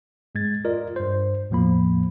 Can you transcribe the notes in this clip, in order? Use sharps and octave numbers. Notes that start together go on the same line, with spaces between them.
G#2 G#3 G#6 A6
F4 A#4 D5 D#5
G2 C5
E2 A2 F3 A#3 B5